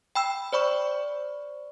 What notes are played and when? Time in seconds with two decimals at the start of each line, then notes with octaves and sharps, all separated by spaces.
0.15 G5 B5 E6
0.53 C5 D5 B5 C#6